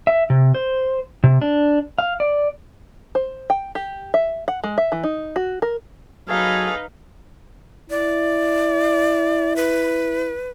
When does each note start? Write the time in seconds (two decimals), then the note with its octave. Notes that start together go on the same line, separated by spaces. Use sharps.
0.07 E5
0.30 C3
0.55 C5
1.24 C3
1.42 D4
1.98 F5
2.20 D5
3.15 C5
3.50 G5
3.75 G4
4.14 E5
4.48 F#5
4.64 G#3
4.78 E5
4.92 E3
5.04 D#4
5.36 F#4
5.62 A#4
6.28 F#3 D#4 G#4 A4 B4 C#5 F5
7.90 E4 D5
9.56 B4